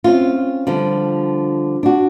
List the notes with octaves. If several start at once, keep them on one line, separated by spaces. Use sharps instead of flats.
C4 C#4 F4
D3 F3 G3
D4 F#4